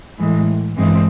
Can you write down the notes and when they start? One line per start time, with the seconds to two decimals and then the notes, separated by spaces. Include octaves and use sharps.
0.19 A2 E3 G#3
0.76 G2 E3 G#3 C4